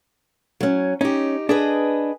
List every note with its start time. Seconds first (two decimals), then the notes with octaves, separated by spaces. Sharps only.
0.61 F#3 C#4
1.01 C#4 D#4 G4
1.49 D4 G#4 B4 D#5